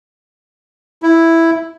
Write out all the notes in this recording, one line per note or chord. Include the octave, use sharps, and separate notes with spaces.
E4